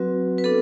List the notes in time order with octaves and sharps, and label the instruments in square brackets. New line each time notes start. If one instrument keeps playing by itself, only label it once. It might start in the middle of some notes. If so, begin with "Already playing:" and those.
Already playing: [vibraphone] F#3 C4 F#4 B4
B4
B3 D4 A4